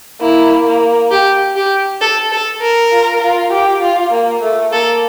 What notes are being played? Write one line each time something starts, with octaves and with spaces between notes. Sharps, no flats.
A#3 E4
A#3
G4
G4
A4
A4
A#4
F4
F4
G4
F4
A#3
A3
A#3 A4